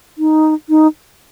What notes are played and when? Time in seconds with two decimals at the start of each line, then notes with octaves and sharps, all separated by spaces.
0.18 D#4
0.69 D#4